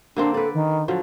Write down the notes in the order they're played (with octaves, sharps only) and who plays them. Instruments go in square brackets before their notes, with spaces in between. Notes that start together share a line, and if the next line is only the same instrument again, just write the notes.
[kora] D3 A#3 C4 [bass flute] D4
[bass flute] A4 [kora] B4 D5
[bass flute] D#3
[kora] D3 F3 F#3